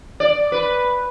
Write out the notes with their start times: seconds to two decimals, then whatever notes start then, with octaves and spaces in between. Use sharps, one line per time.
0.20 D5
0.52 B4